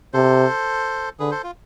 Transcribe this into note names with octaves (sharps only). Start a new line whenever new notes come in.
C3 A4 C5
D3 G#4 B4
A4 C5
F4